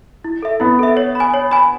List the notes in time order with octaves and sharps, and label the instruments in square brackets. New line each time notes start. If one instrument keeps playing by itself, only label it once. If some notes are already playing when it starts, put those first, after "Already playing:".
[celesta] E4
A4 E5
[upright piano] B3 [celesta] E4
[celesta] A4 E5
C#5
B5
G#5
C#5
G#5 B5